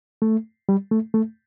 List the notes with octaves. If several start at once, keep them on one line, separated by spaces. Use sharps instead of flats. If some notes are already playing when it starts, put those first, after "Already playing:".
A3
G3
A3
A3